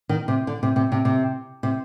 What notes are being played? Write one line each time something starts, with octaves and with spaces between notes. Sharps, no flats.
D#3
C3
D3
C3
C3
C3
C3
C3